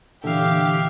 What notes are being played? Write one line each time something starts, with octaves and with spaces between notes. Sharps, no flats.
A#2 D3 E3 G4 E5 F5